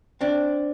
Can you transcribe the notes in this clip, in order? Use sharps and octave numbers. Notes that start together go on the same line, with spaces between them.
C4 D4